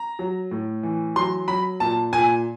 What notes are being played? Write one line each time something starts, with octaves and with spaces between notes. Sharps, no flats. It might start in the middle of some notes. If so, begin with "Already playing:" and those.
Already playing: A#5
F#3
A2
E3
F#3 C6
F#3 B5
A#2 A5
A#2 G#5